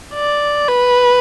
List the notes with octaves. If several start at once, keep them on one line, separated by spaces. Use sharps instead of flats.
D5
B4